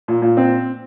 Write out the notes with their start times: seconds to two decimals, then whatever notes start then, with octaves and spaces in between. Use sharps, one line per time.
0.08 A#2
0.22 A#2
0.37 C4